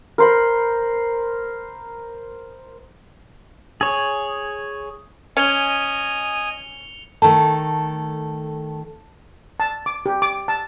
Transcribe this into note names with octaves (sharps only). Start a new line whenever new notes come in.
A#4 C5 B5
G#4 C#5
C#4 D#5 G#5 C#7 F7 G7
D#3 A3 A4 A5
A5
D6
G4
D6
A5